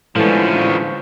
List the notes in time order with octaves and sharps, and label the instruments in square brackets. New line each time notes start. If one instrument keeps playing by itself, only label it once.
[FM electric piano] A2 E3 A5 [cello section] D3 G#3 [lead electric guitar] F3 C#4